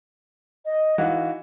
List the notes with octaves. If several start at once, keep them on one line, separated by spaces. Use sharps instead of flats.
D#5
E3 D#4 F#4 F5